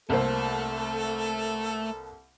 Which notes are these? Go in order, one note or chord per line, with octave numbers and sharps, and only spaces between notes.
C2 A3 A#3 A4 C5